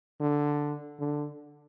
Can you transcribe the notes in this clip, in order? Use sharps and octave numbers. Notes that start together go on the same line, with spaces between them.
D3
D3